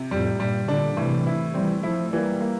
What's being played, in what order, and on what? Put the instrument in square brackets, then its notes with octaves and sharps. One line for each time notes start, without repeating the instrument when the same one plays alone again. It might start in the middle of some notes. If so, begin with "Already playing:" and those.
Already playing: [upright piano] C3
[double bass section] F2 A2 [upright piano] G3
[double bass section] G2 A#2 [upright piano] G3
[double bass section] A#2 D3 [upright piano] D4
[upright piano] A2 [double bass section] C3 E3
[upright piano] E4
[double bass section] E3 G3 [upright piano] C4
[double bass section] F3 A3 [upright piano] E4
[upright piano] E3 [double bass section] G3 A#3
[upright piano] A#3